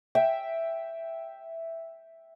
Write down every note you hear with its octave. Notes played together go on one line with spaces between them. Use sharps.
E5 G5